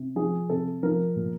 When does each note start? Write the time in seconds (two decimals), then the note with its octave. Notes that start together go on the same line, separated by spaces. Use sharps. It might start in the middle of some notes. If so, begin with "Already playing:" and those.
Already playing: C3
0.16 F3 G#4
0.49 C3 A4
0.83 F3 A#4
1.16 A#2